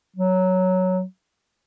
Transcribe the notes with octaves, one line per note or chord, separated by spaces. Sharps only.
F#3